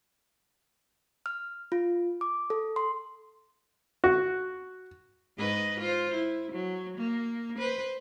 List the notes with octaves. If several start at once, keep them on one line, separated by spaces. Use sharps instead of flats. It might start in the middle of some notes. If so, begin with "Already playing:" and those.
F6
F4
D6
A4
C6
F#4
G#2 B4 D#5
F4 C5
E4
F#3
A#3
B4 C5